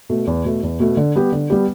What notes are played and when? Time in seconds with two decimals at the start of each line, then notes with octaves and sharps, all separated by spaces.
0.10 B2 A3
0.27 E2
0.45 B2 A3
0.63 E2
0.80 B2 A3
0.97 D3
1.15 G3 B3 G4
1.32 D3
1.50 G3 B3 G4